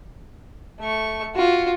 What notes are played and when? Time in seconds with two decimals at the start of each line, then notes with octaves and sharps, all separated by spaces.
0.80 A3 C#6
1.35 F4 F#4